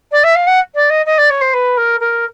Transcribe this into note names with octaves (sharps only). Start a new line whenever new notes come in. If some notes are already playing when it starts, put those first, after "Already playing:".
D5
E5
F5
F#5
D5
D#5
D#5
D5
C#5
C5
B4
A#4
A#4